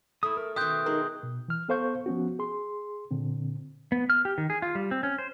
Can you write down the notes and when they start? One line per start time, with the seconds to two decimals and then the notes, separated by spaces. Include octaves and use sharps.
0.23 A3 E4 D#6
0.37 A#4
0.56 B2 D#3 E5 G5 C6 D#6 F#6 G6
0.86 G#3 D#4 A#4
1.23 B2
1.48 E3 F6
1.69 B3 A4 C5 F5 C#6 G6
2.06 F3 B3 C#4 F#4
2.39 G#4 C6
3.11 A#2 D3 C4
3.92 B3
4.10 F6
4.25 G4
4.38 D#3
4.50 G#4
4.62 F4
4.75 G3
4.91 C4
5.03 C#4
5.18 C5